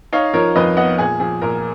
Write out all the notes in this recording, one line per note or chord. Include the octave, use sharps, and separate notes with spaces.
D#4 C#5 F5
F3 A#4 C#5
F2 B4 D#5
B3 D#5 F#5
A#2 G#4
F3 G#4
A#2 A#4